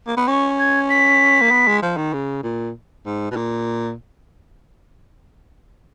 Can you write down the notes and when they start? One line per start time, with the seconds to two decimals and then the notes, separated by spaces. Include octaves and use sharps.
0.07 A#3
0.17 B3
0.27 C#4 C#6
0.58 G#6
0.89 B6
1.41 A#3
1.51 B3
1.67 G#3
1.83 F3
1.97 D#3
2.14 C#3
2.43 A#2
3.06 G#2
3.31 B2
3.37 A#2